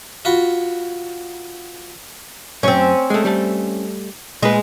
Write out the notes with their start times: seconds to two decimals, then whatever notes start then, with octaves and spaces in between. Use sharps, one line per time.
0.25 F4 F#4 B5
2.63 F#2 C4 C#4 C#5
3.10 G#3 A3
3.25 G3 A3 A4
4.43 A#2 G#3 B4